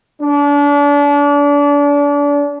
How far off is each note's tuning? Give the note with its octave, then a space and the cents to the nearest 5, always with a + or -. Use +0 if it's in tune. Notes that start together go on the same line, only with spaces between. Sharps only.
D4 -35